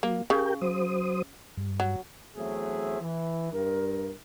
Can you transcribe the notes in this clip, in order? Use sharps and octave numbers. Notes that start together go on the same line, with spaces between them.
F#3 A#3
C#3 G4 A#4 G5
F#3 C5 D#6
G2
F#3
E2 F#3 A3 C4 G#4 E5
E3
G2 A#4